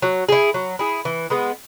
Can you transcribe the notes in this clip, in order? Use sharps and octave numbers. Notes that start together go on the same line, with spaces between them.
F#3
E4 G#4
F#3
E4 G#4
E3
G#3 B3